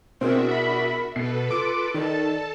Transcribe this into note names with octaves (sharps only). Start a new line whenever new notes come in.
B2 C4 D4 E4 F#4 G#4 A#4 E5
B5
B2 A4 B4 C7
F4 D6
D#3 A4 D5 A5